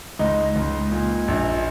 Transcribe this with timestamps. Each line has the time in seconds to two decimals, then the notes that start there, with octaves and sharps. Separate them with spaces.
0.19 C#2 D#4
0.56 C#2
0.91 A#2
1.28 A#1